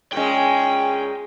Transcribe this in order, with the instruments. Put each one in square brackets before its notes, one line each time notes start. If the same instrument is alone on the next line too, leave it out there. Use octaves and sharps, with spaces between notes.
[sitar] A#2 G#3 [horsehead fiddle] C#4 [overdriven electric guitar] G5